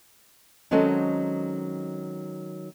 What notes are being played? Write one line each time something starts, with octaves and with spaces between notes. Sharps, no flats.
D#3 F#3 G#3 C4 C#4 A4